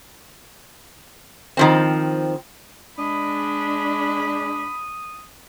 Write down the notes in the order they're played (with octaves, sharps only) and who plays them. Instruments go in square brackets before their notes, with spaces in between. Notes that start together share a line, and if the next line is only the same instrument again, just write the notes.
[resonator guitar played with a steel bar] D#3 F3 C4
[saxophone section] G#3 D4 [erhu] B5 [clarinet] D#6